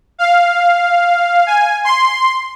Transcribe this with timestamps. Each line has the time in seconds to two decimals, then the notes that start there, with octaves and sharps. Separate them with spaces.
0.19 F5
1.47 G#5
1.84 C6